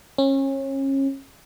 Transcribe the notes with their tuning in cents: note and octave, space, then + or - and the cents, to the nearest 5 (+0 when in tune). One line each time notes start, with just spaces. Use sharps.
C#4 -30